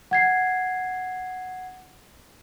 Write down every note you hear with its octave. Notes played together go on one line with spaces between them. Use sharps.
F#5 G#6 C7